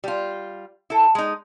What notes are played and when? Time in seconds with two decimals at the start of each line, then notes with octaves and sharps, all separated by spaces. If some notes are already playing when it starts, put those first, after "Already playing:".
0.04 G3 F4
0.90 E4 A4
1.15 G#3 D#4